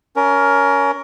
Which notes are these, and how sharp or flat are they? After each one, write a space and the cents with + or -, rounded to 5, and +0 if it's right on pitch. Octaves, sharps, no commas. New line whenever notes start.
C#4 +25 A#4 +5